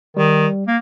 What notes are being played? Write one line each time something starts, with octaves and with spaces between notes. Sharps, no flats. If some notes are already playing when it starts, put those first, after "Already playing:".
D#3 G3
A#3